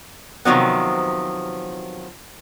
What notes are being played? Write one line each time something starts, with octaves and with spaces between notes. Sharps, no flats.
C3 D#3 F3 F#3 B3